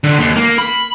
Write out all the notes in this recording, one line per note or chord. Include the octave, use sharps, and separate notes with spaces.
D3
D#2
A#3
B5